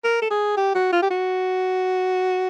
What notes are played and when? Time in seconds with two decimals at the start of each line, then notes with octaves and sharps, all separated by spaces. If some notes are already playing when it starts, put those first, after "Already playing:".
0.04 A#4
0.22 A4
0.31 G#4
0.57 G4
0.75 F#4
0.93 F4
1.02 G4
1.10 F#4